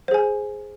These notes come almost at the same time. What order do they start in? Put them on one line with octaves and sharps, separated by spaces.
C5 G#4 G#5